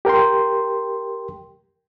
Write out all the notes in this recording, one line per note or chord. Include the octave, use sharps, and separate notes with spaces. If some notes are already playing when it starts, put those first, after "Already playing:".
G4 A#4 G5 C6